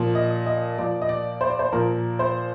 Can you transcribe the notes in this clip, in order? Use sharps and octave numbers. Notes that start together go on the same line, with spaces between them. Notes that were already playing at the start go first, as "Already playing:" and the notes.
Already playing: A#2 F3
D#5
D#5
A#2 F3 D5
D#5
D5
C5
D5
C5
A#2 F3 A#4
C5